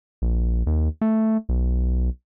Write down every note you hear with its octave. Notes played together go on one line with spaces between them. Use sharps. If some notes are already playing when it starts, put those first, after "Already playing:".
A#1
D#2
A3
B1